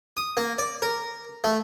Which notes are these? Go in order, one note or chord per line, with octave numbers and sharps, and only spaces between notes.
D#6
A#3
D5
A#4
A3